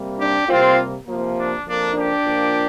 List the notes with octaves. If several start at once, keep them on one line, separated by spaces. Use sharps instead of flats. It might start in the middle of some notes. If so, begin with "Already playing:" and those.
Already playing: C3 G3 A#3
D4 G4
C3 G3 A#3 C4 F4
C3 F3 A#3
D4
F2 F3 A#3 D4
D4 G4
A#2 F3 A#3